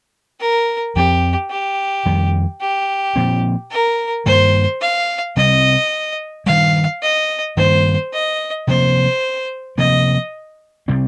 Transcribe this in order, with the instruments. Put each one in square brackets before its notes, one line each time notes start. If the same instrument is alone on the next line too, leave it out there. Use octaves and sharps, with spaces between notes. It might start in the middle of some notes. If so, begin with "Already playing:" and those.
[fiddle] A#4
[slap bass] F2 F3 C4 [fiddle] G4
[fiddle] G4
[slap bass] F2 D#3 G3
[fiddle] G4
[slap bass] A#2 F3 C4
[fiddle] A#4
[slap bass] G2 D#3 A#3 [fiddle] C5
[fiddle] F5
[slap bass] C3 G3 C4 [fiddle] D#5
[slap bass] G2 D#3 G3 [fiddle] F5
[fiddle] D#5
[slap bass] G2 D#3 G3 A#3 [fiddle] C5
[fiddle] D#5
[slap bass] C3 F3 A#3 [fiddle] C5
[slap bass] C3 F3 A#3 [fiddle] D#5
[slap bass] C3 G3 C4